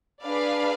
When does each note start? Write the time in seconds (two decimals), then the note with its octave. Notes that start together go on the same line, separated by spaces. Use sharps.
0.22 D4 G#4 B4 D5 F5